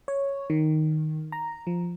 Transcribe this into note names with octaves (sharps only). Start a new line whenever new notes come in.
C#5
D#3
A#5
F3